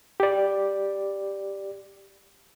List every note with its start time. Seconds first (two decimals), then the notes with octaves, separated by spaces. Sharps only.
0.20 G4 D5